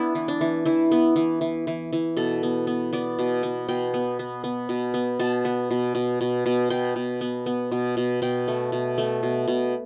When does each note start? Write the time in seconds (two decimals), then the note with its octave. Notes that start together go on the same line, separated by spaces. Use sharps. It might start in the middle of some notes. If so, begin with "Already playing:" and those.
Already playing: B3 D4 E4
0.15 E3
0.28 D4
0.41 E3
0.65 E3 E4
0.92 B3
1.16 E3
1.41 E3
1.67 E3
1.93 E3
2.17 B2 A4
2.43 B3
2.67 B3
2.93 B3 D5
3.19 B2
3.43 B3
3.69 B2 G5
3.94 B3
4.19 B3
4.44 B3
4.69 B2
4.94 B3
5.19 B2 A5
5.45 B3
5.71 B2
5.95 B2
6.21 B2
6.46 B2
6.70 B2 G5
6.96 B2
7.21 B3
7.46 B3
7.71 B2
7.97 B2
8.22 B2 G5
8.48 A3
8.72 B2
8.98 A3
9.23 B2
9.48 B2